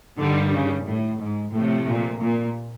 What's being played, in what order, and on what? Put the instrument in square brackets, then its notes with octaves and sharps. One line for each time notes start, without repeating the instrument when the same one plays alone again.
[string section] G2 D#3 G3 [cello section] D3
[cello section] C#3
A2
G#2
[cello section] A2 [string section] C3 F3 A3
[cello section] A#2
A#2